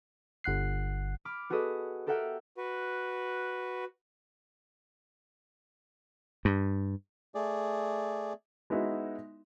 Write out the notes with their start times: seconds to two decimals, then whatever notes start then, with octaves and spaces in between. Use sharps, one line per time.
0.44 G1 F#5 F#6 C7
1.25 B5 D6 F6
1.50 B3 F#4 G#4 A4 B4 D#5
2.06 G4 A4 A#4 E5 F#5 G5
2.57 F#4 B4
6.45 G2
7.35 A3 G#4 D5
8.70 G#3 B3 D#4 E4 F#4